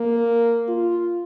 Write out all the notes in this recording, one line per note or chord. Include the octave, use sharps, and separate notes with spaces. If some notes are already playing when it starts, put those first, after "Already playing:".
Already playing: A#3
F4